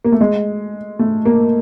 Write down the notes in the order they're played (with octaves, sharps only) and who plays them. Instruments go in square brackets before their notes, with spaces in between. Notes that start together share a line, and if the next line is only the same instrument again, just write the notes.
[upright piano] A#3
A3
G#3
A3
A#3